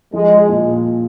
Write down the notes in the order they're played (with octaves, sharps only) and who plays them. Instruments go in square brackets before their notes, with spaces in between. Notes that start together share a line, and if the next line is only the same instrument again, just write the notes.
[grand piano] F3 [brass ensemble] G#3
[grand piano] A#2